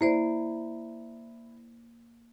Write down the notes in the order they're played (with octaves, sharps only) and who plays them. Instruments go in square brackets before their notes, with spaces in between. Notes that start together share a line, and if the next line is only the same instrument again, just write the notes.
[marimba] A#3 C5 D5 [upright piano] E4